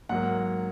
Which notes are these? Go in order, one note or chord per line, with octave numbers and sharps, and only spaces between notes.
G#2 F#3 A#3 F#5